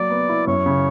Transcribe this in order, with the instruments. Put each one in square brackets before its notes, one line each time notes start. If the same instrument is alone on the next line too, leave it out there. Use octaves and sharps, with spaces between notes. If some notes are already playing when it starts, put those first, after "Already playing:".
Already playing: [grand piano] F#3 A#3 [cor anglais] D5
[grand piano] B3
E4
[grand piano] F#2 [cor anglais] C#5
[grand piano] C#3